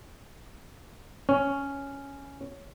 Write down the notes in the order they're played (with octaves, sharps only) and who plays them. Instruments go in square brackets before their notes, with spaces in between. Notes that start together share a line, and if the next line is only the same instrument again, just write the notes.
[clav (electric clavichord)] C#4